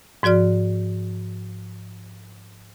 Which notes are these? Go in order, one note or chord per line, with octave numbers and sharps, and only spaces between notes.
G#2 F3 F#4 D5 F6